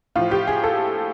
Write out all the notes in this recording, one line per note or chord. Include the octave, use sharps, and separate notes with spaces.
A2 F3 F4
G4
G#4
A4